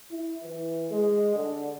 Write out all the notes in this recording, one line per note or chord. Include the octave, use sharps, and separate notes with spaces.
E4
E3
G#3
D3